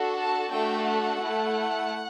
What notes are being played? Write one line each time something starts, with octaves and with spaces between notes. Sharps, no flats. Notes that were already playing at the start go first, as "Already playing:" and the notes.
Already playing: D4 F#4 A4
A5
A3 D4 F#4 A4 G5
F#5
A3 E4 A4